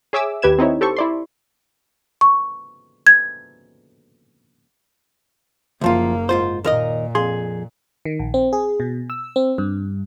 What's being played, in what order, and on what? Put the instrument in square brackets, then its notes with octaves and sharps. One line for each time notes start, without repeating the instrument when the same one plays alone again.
[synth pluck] G#4 C#5 E5 G#5 D6 E6
D#2 G4 B4 G#6 E7
C4 D#4 E4 C#5
G4 A4 C5 C#6
E4 D5 C6
[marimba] C#6
G#6
[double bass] F#1 A#3 [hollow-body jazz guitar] D2 F3 F4
[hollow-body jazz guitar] G#2 F4 C5
[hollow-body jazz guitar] D#2 A#4 D#5 [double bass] A#2
[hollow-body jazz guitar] F2 G#4 C6
[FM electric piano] D#3
A#1
C4
G#4
B2
E6
C4
G2